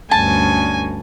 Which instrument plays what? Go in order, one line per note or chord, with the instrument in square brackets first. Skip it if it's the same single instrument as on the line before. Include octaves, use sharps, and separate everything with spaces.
[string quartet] D2 G2 C#4 [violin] G#5 [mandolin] A5